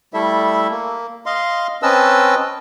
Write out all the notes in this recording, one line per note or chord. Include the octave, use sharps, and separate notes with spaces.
G3 A3 E4 A4 E5
A#3
D#5 F5 C6
C4 C#4 B4 D#5 A5 E6